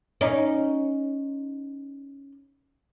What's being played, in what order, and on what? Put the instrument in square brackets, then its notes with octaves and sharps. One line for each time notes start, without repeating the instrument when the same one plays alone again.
[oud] C#4 D#4